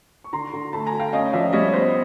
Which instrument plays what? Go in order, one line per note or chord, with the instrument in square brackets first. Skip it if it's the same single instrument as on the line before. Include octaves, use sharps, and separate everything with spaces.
[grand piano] C#6
D3 A#5 C6
D3
A3 A5 B5
G#5 A#5
A3
F5 G5
C#4 D#5 F5
F3 D5 E5
G3 C#5 D#5
B3 C5